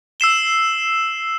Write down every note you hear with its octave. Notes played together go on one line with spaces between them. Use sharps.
E6 C7 E7 G7